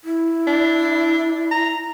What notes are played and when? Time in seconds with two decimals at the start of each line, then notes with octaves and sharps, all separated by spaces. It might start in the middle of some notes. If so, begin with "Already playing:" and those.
0.04 E4
0.47 D4
1.51 A#5